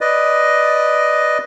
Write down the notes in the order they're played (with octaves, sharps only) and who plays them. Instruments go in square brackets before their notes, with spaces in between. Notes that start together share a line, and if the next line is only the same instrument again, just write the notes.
[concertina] B4 D5 D#5